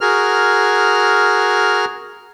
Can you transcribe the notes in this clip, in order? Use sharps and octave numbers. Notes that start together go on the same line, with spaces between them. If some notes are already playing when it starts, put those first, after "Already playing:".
F#4 G#4 A#4 F6